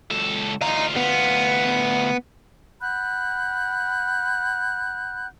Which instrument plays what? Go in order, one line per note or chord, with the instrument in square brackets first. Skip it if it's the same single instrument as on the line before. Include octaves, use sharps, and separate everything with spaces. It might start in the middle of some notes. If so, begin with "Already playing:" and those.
[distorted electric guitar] C#2 A4
[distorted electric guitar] D2 F4 [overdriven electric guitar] D#5 A#5
[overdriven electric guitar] B3
[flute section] F#5 B5 F#6 G6